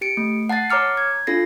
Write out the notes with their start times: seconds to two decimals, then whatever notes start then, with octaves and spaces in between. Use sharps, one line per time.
0.01 G4 C#7 D7
0.17 A3
0.49 F#5 A5 F#6 A6 C7
0.70 C#5 A#5 D6 F6 C#7
0.97 G#6
1.27 D4 F4 A4 A#6 C7